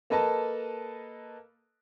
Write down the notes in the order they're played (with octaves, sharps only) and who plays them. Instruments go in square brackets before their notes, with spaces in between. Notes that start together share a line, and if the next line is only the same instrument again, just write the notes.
[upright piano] A#3 A4 B4 D#5 A5